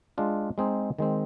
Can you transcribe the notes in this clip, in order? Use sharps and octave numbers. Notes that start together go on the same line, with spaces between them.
G#3 D4 F4
G#3 C4 D#4 G#4
D#3 G#3 C4